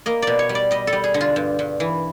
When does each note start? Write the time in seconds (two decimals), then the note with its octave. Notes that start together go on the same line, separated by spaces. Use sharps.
0.06 A#3 D#5
0.22 B2 D5
0.39 C#5
0.49 G3
0.55 D5
0.71 G3 D#5
0.87 A4
0.93 G3
1.04 G#4
1.14 D3
1.21 F4
1.36 G2
1.59 G2
1.80 E3